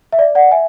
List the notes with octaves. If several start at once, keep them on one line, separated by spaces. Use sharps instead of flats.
E5
D5
D5 F#5
E5 G#5